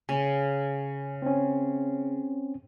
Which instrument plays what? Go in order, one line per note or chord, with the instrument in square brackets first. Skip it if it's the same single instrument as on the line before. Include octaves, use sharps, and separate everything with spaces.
[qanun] C#3 [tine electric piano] G#5
[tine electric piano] C4 C#4